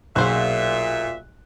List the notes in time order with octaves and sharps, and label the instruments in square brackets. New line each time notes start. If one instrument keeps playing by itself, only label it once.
[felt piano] B1 G#4 F#6 [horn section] A#2 E5 [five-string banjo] F#4 C5 F5